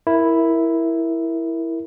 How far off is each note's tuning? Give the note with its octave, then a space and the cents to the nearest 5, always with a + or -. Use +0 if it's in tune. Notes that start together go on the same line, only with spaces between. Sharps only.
E4 +0 A#4 +0